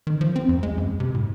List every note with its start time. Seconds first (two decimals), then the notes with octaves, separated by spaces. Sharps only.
0.07 D#3
0.21 F3
0.36 C4
0.49 F2
0.63 G#3
0.78 F#2
1.00 C3
1.15 A2